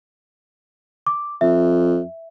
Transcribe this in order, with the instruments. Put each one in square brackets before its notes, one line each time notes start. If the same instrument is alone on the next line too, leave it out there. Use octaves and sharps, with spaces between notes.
[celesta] D6
[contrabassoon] F2 [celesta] E5